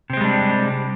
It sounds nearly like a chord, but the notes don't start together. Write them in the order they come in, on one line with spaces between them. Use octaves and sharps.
C3 C4 G#3 G3 D4